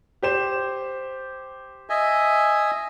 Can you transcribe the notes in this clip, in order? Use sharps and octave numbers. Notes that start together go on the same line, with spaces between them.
G4 C5 E7
D#5 E5 G#5